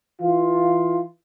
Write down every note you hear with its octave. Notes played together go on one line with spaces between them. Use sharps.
E3 F4